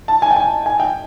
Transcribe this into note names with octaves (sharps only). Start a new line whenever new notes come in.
A5
G#5
G5
G#5
G#5
G5